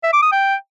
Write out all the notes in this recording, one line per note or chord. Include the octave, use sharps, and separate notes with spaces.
E5
D6
D#6
G5